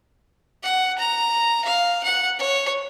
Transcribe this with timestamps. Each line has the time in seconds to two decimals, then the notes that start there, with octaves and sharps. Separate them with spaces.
0.63 F#5
0.99 A#5
1.65 F5
2.04 F#5
2.39 C#5